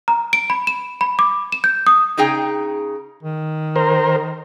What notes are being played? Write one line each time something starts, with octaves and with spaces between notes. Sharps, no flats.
A#5
D7
B5
E7
B5
D6
E7
G6
D#6
C#3 D#4 G#4 G5
D#3
A#4 C5